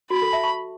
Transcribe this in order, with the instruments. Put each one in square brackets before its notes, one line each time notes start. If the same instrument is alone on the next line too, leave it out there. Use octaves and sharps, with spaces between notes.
[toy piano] F#4 [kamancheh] B5
[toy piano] A4
E5 A5
A5 C#6